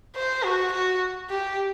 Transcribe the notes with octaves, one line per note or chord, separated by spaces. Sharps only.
C5
F#4
F#4
G4